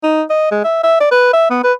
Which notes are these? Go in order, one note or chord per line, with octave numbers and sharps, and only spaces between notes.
D#4
D#5
G#3
E5
E5
D5
B4
E5
B3
B4